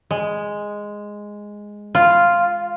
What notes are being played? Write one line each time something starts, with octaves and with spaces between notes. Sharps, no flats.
G#3
F4